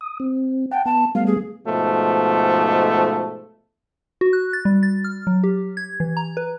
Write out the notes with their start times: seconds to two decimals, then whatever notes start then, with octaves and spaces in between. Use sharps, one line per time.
0.01 D#6
0.20 C4
0.71 F#5 G5 A5
0.85 B3 A5
1.15 G3 A3 B3 F5
1.26 G#4
1.67 G#2 B2 F3 A3
4.21 F#4
4.33 F#6
4.53 A6
4.65 G3
4.83 A6
5.04 F6
5.27 F#3
5.44 G4
5.77 G#6
6.00 E3
6.17 A#5
6.37 B4